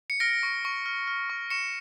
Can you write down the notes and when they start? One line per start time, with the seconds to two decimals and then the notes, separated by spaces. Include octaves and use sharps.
0.10 C#7
0.20 F6 A#6 D7
0.43 C#6
0.65 C#6
0.86 F6
1.07 F6
1.30 C#6
1.50 C#6 C#7 E7